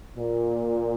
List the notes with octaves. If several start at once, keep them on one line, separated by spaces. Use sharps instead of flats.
A#2